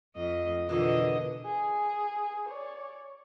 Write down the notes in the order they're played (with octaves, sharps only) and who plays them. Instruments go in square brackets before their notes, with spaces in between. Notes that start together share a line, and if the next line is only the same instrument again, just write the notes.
[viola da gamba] F2 D#5
[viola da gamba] B2 D3 D#5 [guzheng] E3 A#3 B3 [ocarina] F4
[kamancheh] G#4
C#5 D5